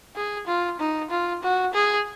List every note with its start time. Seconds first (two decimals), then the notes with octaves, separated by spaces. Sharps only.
0.15 G#4
0.47 F4
0.80 D#4
1.10 F4
1.43 F#4
1.73 G#4